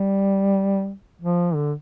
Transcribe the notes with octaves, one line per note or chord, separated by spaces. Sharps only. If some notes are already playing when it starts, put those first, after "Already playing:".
Already playing: G3
F3
D3